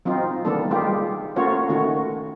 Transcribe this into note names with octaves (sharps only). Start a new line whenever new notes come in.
F#3 C4 D#4 F4
D#3 G3 A#3 B3 D4 A4
G3 G#3 F4 G4
A3 A#3 C#4 F4 F#4 C#5
D#3 A3 C#4 F#4